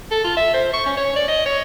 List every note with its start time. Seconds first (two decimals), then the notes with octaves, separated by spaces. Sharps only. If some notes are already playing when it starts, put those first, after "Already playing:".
0.11 A4
0.24 F4
0.37 E5
0.54 C5
0.73 C#6
0.86 C#4
0.97 C#5
1.16 D5
1.28 D#5
1.46 C#5